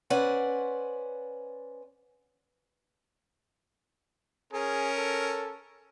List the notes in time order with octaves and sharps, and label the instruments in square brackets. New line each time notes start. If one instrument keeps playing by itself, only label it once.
[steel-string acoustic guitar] C#4 B4 C5 D5 F#5
[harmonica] C#4 A#4 [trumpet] G#4
[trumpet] A4